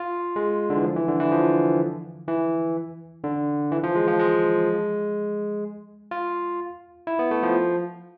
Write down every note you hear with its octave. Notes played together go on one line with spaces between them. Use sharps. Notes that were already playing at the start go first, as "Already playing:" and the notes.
Already playing: F4
G#3
D3
E3
F3
E3
D3
E3
F3
E3
D3
E3
F3
G#3
F3
G#3
F4
E4
B3
A3
F3